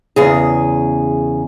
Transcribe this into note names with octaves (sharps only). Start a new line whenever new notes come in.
E2 C#3 G#4